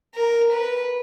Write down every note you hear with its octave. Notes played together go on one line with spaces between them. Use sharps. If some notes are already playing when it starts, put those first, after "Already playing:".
A#4
B4